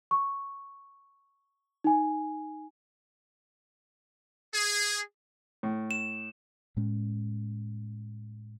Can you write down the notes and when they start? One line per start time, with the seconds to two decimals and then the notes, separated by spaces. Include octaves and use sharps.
0.11 C#6
1.84 D#4 G#5
4.54 G#4
5.63 A2
5.91 E7
6.77 A2 G#3 C#4